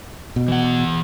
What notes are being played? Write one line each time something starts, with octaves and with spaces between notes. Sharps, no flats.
B2
E3 F#5